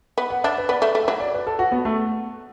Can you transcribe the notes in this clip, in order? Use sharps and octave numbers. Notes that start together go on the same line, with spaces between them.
B3
F#5
D4 E5
B4
B3 D5
A3
A3
F#3 E5
D5
B4
A4
F#4
B3
A3